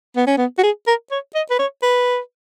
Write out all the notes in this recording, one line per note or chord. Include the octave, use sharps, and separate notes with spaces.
B3
C#4
B3
F#4
G#4
A#4
C#5
D#5
B4
C#5
B4